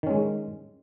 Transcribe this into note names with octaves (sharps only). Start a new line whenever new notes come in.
D#3 G#3 C#4